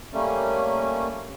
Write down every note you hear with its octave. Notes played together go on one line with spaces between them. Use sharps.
G3 A3 A#3 C#4